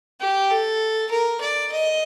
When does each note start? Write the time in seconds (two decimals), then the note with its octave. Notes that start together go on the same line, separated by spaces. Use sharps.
0.20 G4
0.50 A4
1.11 A#4
1.41 D5
1.71 D#5